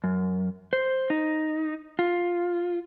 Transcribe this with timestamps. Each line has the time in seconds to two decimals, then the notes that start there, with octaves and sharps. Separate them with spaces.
0.04 F#2
0.73 C5
1.10 D#4
1.99 F4